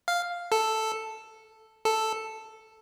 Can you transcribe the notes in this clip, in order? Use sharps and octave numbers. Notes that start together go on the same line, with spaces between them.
F5
A4
A4